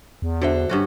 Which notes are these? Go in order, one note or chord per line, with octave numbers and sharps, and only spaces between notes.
E2
D3 F#4 C5 E5
G2 C#4 F#4